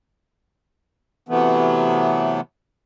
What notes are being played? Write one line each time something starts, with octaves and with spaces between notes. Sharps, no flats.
C3 E3 F#3 A3 B3